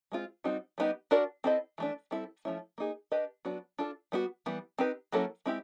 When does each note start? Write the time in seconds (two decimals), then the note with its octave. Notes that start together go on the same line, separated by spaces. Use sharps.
0.12 G#3 C4 F4
0.44 G3 C4 D#4 F#4
0.78 G3 B3 D#4 G4
1.11 D4 F#4 A#4 D5
1.44 C4 E4 A4 C5 D#5
1.78 E3 A3 D4
2.11 G3 C4 E4 A4
2.45 F3 A3 C#4 E4
2.78 A#3 D#4 G#4
3.12 D4 G4 B4 D#5
3.45 F#3 B3 D4 F#4
3.78 D4 F4 A4
4.12 G3 B3 D#4 F#4
4.46 E3 G3 B3
4.78 C4 D#4 G4 B4
5.12 F#3 A#3 C#4 E4 A4
5.46 G#3 C4 E4 G4